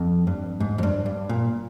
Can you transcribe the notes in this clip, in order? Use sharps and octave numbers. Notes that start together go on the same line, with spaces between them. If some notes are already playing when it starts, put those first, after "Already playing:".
Already playing: F2
G2
G#2
F2
G2
G2
A#2